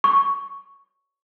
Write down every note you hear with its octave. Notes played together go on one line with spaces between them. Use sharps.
C#6